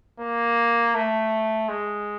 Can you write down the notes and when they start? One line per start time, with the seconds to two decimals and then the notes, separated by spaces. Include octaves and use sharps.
0.20 A#3
0.95 A3
1.69 G#3